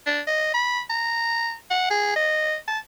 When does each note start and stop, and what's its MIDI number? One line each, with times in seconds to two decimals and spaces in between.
0.06 0.21 62
0.27 0.53 75
0.54 0.81 83
0.90 1.54 82
1.71 1.87 78
1.90 2.12 68
2.16 2.56 75
2.68 2.78 81